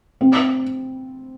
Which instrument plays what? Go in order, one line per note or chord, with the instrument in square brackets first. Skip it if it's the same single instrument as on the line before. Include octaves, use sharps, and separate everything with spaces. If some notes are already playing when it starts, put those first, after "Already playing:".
[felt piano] C4